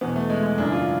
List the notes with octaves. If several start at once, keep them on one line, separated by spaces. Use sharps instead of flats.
E2 B2 B3
A3
G#3
G#3
F#2 C#3 E3 D4
F4